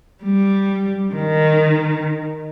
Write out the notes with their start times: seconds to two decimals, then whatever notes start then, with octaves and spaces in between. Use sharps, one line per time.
0.24 G3
1.14 D#3